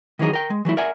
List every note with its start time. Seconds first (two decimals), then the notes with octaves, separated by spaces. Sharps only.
0.19 D#3 E3 F#3 D#4 G#4
0.33 A#4 G5
0.50 G#3
0.65 E3 F#3 A3 E4
0.77 A#4 D5 E5 F#5 G#5